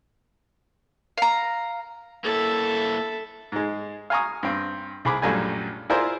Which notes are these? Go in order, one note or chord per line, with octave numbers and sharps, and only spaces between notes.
F5 A#5
A#3 E4 A4 E5
G#2 G#3
F5 G#5 A#5 C#6 D#6
G2 C4
C2 G#4 B5 D6
A#1 F#2 G3 A3 G#5
E4 F4 G#4 A#4 C5 D5